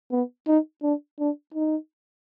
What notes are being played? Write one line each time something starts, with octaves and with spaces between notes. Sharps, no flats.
B3
D#4
D4
D4
D#4